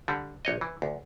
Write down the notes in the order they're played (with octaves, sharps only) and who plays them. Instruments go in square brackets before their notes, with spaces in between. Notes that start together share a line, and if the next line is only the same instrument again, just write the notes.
[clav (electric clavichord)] D3 G3
A#1 C#5 D#5
E3
D2